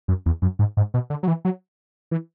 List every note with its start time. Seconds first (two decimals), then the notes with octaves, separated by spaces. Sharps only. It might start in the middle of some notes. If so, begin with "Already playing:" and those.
0.08 F#2
0.26 E2
0.42 F#2
0.59 G#2
0.77 G#2
0.94 B2
1.10 D3
1.23 F#3
1.28 E3
1.45 F#3
2.11 E3